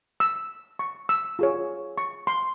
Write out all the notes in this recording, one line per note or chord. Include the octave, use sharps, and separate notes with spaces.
E6
C#6
E6
F4 G#4 C#5
C#6
C6